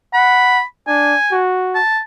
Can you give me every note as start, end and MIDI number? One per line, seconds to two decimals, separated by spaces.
0.14 0.60 78
0.14 0.63 83
0.87 1.15 62
0.87 1.40 80
1.32 1.80 66
1.75 2.00 81